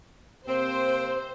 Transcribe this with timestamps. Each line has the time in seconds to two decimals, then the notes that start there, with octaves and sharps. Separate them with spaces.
0.48 C3 A#3 C4 C5